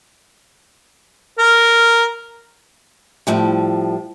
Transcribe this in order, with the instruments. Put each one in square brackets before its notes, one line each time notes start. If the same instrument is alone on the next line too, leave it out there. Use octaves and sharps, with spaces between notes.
[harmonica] A#4
[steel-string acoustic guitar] A2 F3 G3